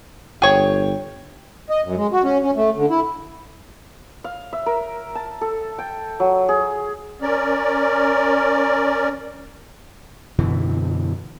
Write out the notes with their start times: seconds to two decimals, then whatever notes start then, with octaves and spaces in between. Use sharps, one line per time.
0.42 G1 G#4 C#5 G5
1.70 D#5
1.84 F#2
1.96 G#3
2.12 F#4
2.24 C#4
2.43 C#4
2.56 A3
2.76 D3
2.90 E4
4.24 F5
4.53 E5
4.66 A#4
5.15 A5
5.41 A4
5.78 G5
6.20 F#3
6.49 G#4
7.21 C#4 A#4 D5
10.39 F#2 B2 D3 E3